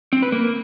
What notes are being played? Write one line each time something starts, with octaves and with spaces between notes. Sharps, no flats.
C4
B4
A#3